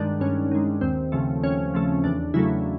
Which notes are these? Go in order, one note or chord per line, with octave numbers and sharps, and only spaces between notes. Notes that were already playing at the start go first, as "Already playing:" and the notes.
Already playing: G2 D#3 G#3 D4
G2 C#4
D#3 G#3
D#2 C4
C#3 F3 A3
D#2 C#4
C#3 F3 A3
E2 D4
C#3 F#3 A3 E4